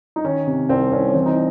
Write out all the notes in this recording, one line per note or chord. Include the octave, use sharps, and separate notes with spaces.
D#4
D#3 C#4
C3
C2 C4
C2 C#4
C#4
E3 C4
D#4